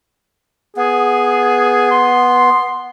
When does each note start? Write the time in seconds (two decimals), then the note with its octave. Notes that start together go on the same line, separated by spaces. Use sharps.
0.77 B3 G#4
1.91 C6